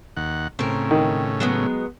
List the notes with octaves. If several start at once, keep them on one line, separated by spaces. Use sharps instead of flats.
D#2 F#5
A2 C#3 C4 A#4
D#3
F#3 G#3 B3